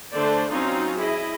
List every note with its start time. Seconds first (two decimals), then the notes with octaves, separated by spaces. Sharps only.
0.13 D3 A3 D4 A4 C5 D5
0.49 F#3 C4 C#4 D#4 F4
0.96 E4 G#4 D#5